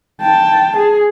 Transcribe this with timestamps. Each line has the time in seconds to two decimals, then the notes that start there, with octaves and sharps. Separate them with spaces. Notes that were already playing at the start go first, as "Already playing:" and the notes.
0.21 G5 A5
0.77 G#4